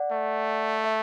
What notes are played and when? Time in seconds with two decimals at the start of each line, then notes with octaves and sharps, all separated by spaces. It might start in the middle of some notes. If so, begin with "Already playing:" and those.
Already playing: D5 F#5
0.11 A3
0.84 E5